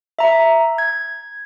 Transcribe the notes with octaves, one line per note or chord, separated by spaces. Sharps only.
E5 A#5
G#6